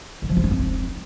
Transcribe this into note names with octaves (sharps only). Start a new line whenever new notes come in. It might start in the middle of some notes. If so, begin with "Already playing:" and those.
D#3
F3
F4
D#4
C4